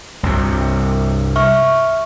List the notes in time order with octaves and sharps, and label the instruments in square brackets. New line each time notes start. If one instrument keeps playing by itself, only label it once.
[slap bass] C2 G2 C3
[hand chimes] E5 C#6 F6